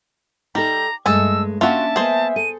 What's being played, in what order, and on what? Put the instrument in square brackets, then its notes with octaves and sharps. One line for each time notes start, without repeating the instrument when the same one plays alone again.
[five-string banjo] G3 [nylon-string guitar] D#4 A4 [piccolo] A#5
[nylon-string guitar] G2 G#3 A3 [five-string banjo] A4 D#5 G#5 [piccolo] E6
[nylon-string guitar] A#3 C#4 D4 [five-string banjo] F4 F#4 [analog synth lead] E5 [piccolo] A5
[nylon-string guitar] A#3 B3 D#5 [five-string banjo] G#4 C5
[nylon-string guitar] A4 [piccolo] D#7